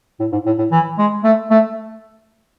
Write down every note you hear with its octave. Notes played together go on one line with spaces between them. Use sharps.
A2
G#2
A2
A2
E3
G#3
A3
A3